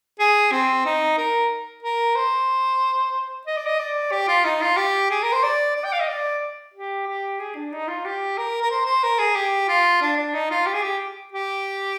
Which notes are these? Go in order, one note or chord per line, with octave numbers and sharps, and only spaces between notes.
G#4
C4
D#4
A#4
A#4
C5
D#5
D5
D#5
D5
G4
F4
D#4
F4
G4
G#4
A#4
C5
D5
D5
G5
F5
D#5
D5
G4
G4
G#4
D4
D#4
F4
G4
A#4
A#4
C5
C5
A#4
G#4
G4
F4
D4
D4
D#4
F4
G4
G#4
G4
G4